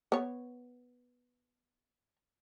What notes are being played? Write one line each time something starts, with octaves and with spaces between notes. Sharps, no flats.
B3 C#5